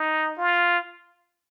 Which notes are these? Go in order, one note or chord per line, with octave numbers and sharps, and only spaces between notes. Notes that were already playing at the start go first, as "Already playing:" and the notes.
Already playing: D#4
F4